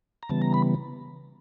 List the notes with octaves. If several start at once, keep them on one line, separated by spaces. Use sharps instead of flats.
A#5
C#3 E3 G3 B3 A5
A#5
B5